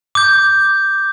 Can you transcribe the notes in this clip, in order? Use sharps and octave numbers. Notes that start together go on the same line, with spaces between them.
D6 G6